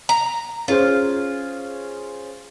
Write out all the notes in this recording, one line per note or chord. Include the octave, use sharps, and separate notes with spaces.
A#5
C#4 F4 G#4 C5